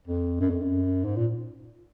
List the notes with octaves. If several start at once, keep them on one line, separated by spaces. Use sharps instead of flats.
F2
F#2
F2
F#2
G#2
A#2